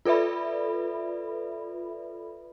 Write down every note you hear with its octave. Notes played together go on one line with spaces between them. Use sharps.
F4 A4 B4 D5 E5 B5